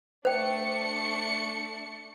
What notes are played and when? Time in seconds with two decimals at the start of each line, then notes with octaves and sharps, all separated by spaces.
0.25 A3 D4 C5 G5 C#7